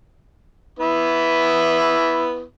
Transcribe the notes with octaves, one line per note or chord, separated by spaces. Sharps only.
B3 E4